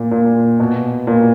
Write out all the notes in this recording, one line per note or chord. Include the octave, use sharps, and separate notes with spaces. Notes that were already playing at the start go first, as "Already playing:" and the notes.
Already playing: A#2
A#2
B2
A#2